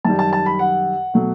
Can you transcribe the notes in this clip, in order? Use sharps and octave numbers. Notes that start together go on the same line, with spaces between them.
F#2 D#3 G3 A5
A5
A5
B5
F#5
B2 F#3 A3